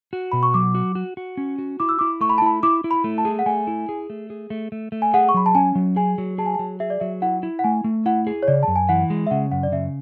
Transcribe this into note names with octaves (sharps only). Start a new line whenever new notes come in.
F#4
B2 B5
C#6
F#3 D6
F#4
F#4
F#4
C#4
F#4
E4 D6
E6
E4 D6
A3 C#6
B5
A5
E4 B5
E4 D6
E4
B5
A3
A5
G#4
F#5
A3 G#5
E4
G#4
A3
G#4
A3
A3
A3
G#5
G#4 F#5
C#6
F#3 B5
A5
C#4 G#5
F#3
G#4 G#5
F#3
G#4 A5
G#5
A5
F#3
G#4 E5
D5
F#3 E5
E4 F#5
E4
F#5
A3 G#5
A3
E4 F#5
G#4
C#5
C#3 D5
F#2 A5
G#5
E3 F#5
G#3
E5
C#3 F#5
F#2 F#5
D5
C#3 E5